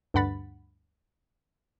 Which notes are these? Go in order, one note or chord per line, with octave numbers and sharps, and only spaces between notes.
D2 G2 F#5 B5 A6